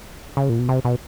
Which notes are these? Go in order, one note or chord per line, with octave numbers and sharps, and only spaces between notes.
C#3
A#2
B2
C3
B2